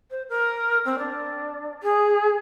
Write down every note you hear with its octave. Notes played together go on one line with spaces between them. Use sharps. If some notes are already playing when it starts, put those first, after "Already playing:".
C5
A#4
C4
D4
G#4